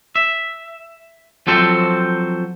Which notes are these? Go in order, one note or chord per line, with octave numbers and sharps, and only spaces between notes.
E5
F3 F#3 C4 A4 C5